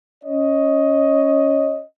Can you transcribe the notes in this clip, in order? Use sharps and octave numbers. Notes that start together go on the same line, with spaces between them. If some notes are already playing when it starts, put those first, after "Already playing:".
C#4 C#5 D#5